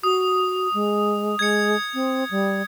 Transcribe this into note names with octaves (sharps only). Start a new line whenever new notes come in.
F#4 D#6
G#3
G#3 G#6 C#7
C4
G3